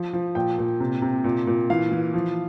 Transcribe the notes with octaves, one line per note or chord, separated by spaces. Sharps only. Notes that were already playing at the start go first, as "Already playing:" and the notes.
Already playing: F3
F3
A#2 G5
A#2
C3
C3
A#2
A#2
E3 F5
E3
F3